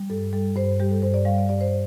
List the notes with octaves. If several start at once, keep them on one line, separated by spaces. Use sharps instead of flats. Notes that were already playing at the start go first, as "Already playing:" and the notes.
Already playing: G3
G2 A4
G3 A4
G2 C5
G3 G4
A4
G2 C5
D5
G3 F5
D5
G2 D5
C5